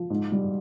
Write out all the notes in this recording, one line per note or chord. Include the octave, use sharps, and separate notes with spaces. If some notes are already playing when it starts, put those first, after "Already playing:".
Already playing: F3
G#2
G3